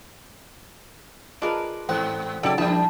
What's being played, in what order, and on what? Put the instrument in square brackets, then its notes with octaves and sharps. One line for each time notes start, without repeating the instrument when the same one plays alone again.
[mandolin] D4 A#4 B4 [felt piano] F4 G#4 D#5
[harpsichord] A1 C4 [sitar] G#2 [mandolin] F#6
[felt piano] C#3 F#3 G5 [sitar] D#4 A4 D5 [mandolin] E4 G4
[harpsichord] A#1 [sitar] G2 D4 [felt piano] E4 G5 [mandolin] A5